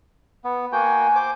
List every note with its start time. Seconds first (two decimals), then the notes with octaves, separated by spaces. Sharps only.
0.44 B3
0.72 A#3 F#4 G5 G#5
1.15 C5 D6